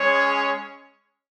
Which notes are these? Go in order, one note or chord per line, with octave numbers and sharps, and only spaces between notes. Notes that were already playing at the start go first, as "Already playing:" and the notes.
Already playing: G#3 C#4 G#4 C#5